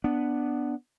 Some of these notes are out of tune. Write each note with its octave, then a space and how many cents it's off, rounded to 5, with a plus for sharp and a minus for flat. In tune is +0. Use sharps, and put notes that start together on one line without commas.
B3 +0 D4 +5